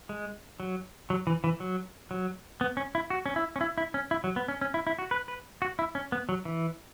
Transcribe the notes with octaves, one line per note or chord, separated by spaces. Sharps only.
G#3
F#3
F#3
E3
E3
F#3
F#3
B3
C#4
E4
F#4
C#4
E4
C#4
E4
E4
C#4
E4
F#3
B3
C#4
C#4
E4
E4
F#4
B4
B4
F#4
E4
C#4
B3
F#3
E3